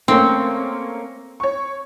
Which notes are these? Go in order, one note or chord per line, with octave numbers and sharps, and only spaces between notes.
A3 A#3 C4 C#4
C#5 C#6